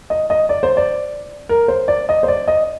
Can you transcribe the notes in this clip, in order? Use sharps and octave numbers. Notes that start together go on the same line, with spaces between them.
D#5
D#5
D5
C5
D5
A#4
C5
D5
D#5
C5
D5
D#5